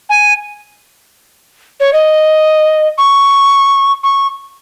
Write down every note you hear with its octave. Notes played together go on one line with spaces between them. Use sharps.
G#5
C#5
D#5
C#6
C#6